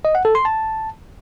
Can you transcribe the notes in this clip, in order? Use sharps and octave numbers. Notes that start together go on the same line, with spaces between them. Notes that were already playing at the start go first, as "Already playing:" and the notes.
D#5
F#5
A4
C6
A5